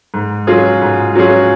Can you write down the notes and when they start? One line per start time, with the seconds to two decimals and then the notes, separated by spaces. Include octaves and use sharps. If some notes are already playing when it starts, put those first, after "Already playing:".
0.14 G#2
0.47 F#3 C#4 F4 G#4
0.82 G#2
1.15 F#3 C#4 F4 G#4